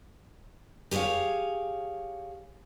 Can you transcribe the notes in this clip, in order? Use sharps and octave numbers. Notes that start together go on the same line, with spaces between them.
G4 G#4 B4 C#5 F5